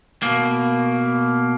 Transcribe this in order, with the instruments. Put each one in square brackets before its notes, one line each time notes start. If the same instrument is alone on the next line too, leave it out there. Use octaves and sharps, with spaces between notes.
[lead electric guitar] B2 A#3